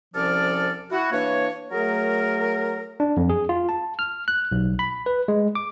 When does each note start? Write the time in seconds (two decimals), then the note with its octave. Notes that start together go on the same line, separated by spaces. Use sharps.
0.14 C2 F3 C#4 A4 D5 F6
0.91 E4 F#4
1.12 E3 A#3 D4 C#5
1.71 F#3 A3 G#4 A#4
3.00 D4
3.17 F2
3.30 G#4
3.49 F4
3.69 A5
3.99 F6
4.28 F#6
4.52 B1
4.79 B5
5.06 B4
5.28 G#3
5.55 D6